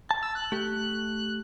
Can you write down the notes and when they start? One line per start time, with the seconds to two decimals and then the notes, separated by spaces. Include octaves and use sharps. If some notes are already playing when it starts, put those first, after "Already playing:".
0.11 A5
0.23 E6
0.35 F#6
0.52 A3 G4